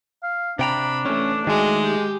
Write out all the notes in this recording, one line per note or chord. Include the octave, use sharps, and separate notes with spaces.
F5
C3 D4 G5 A#5 B5
E3 A3 C#4
D#3 G#3 A3 F#4 D#5
G4